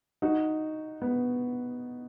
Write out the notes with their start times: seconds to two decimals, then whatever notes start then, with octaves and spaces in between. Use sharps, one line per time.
0.22 D#4 F#4
1.02 B3